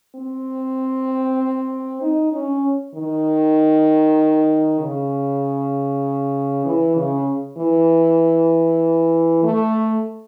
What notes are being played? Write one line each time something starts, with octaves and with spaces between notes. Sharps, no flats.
C4
D#4
C#4
D#3
C#3
E3
C#3
E3
A3